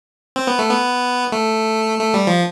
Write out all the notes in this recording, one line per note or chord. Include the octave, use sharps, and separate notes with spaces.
C4
B3
A3
B3
A3
A3
G3
F3